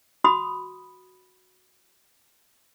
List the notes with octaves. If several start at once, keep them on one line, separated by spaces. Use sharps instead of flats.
F#4 B5 D#6